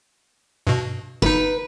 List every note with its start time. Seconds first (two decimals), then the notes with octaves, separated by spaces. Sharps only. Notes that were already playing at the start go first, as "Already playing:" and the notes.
0.67 G2 B2
1.22 G1 D#4 B4